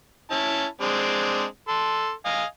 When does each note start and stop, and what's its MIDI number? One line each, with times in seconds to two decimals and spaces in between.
0.31 0.64 61
0.31 0.64 64
0.31 0.64 81
0.81 1.43 56
0.81 1.43 60
0.81 1.43 62
1.68 2.11 69
1.68 2.11 84
2.25 2.43 75
2.25 2.43 77
2.25 2.43 80